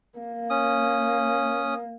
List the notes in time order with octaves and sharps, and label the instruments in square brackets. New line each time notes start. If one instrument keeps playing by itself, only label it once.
[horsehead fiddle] A#3
[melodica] C#4 D#6